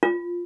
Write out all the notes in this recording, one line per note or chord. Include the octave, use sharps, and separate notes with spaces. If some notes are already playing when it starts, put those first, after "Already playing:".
F4